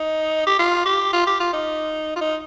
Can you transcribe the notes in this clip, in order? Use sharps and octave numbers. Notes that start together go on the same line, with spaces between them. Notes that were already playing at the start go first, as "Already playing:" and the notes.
Already playing: D#4
G4
F4
G4
F4
G4
F4
D#4
F4
D#4